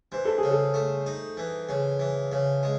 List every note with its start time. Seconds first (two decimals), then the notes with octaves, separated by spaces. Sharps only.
0.12 E3 C5
0.25 A4
0.38 G#4
0.43 C#3
0.51 A4
0.74 A3
1.06 D#4
1.37 E3
1.69 C#3
2.00 E3
2.32 C#3
2.63 G#3